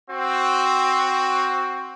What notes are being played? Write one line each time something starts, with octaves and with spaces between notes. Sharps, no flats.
C4 F#4